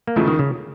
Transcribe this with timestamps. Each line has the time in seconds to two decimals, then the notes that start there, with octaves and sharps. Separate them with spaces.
0.07 A#3
0.16 E2 C#3 F3 G#3 A3
0.28 D#3
0.39 C#3